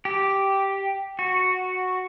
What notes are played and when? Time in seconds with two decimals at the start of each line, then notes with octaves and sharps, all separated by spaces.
0.05 G4
1.19 F#4